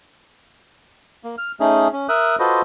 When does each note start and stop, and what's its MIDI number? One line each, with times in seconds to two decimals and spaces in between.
1.24 1.36 58
1.38 1.52 89
1.60 1.88 57
1.60 1.88 61
1.60 1.88 63
1.60 1.88 68
1.93 2.07 61
2.09 2.36 70
2.09 2.36 76
2.09 2.36 87
2.09 2.36 90
2.39 2.62 65
2.39 2.62 66
2.39 2.62 69
2.39 2.62 71
2.39 2.62 72
2.39 2.62 75